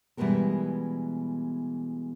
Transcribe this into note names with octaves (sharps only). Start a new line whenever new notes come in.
B2 E3 G3 G#3 B3 A#4